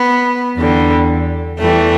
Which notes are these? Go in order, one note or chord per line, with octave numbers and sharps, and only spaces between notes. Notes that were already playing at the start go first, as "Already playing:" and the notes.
Already playing: B3
E2 D3 G3
E2 E3 G3 A3